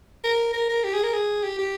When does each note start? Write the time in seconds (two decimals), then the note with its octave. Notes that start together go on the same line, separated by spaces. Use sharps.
0.24 A#4
0.53 A#4
0.69 A#4
0.84 G4
0.94 G#4
1.03 A#4
1.13 G#4
1.44 G4
1.59 G4